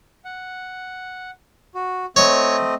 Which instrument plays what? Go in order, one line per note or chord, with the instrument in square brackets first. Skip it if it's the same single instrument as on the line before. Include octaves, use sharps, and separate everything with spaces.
[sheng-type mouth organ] F#5
F#4
[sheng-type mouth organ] A3 C4 D#5 [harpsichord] C#5